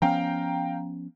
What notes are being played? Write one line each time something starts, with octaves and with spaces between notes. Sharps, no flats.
F3 B3 C#4 F5 G5 A#5